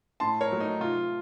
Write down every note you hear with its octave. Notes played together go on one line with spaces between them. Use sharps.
A2 A5 C6
A#4 C#5
F#3 A3
D#4
C3 F4